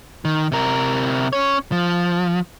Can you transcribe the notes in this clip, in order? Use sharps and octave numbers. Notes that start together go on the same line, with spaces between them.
D#3
C3 A#4
C#4 C#5
F3